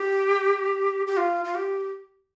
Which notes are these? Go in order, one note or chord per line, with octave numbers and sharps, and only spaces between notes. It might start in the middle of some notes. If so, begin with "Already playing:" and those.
Already playing: G4
G4
F4
F4
G4